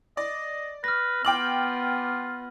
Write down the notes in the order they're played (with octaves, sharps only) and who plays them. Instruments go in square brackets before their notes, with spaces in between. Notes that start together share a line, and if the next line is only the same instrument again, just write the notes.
[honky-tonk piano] D5 [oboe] D#5
[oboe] B4 [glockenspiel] F6 A#6
[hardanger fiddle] B3 [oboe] F4 [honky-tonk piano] G5 D6 F6 [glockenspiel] F#7